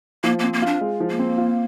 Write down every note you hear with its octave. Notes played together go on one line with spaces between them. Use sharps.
F3 A#3
A#3 C4
A#3
D4 F4
G#3
F3
A#3
C4
F4